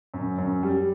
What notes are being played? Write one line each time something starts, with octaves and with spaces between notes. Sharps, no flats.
F#2
F#2
G3